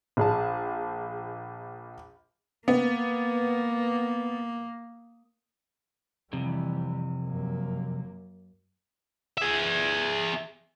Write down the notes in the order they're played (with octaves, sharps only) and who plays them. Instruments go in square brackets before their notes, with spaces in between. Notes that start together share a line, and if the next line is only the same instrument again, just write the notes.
[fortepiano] A#1 G#4 A5
[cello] A#3 [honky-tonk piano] B3
[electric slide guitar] F2 C3 [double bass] E3 G3
[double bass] F#2 A#3
[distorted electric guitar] G#4 E5